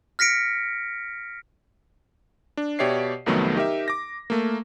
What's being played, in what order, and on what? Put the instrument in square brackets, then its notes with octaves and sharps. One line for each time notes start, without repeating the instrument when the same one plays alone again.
[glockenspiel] F6 A#6 B6 C#7 D7
[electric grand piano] D4
B2 G4 C#5 D5 E5 C7
C2 F2 D#3 F#3 A3 B3
D#4 G4 A#4 E5
D6 A#6
A3 A#3